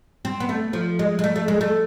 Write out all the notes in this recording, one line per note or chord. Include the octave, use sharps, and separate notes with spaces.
C4
B3
A3
F3
G#3
G#3
A3
A3
G#3
A3